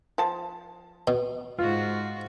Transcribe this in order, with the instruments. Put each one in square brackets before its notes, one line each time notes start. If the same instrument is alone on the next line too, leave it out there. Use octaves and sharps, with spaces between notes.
[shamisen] F3 A5
[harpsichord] B2
[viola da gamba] G#2 F#4 [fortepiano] F4